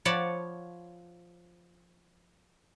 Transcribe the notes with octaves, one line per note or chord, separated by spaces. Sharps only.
F3 C#5 D5 F#5 A5 B5